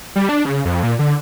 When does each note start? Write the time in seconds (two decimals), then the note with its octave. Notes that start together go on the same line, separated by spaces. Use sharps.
0.16 G3
0.29 D4
0.45 C#3
0.65 F2
0.83 A#2
0.99 D3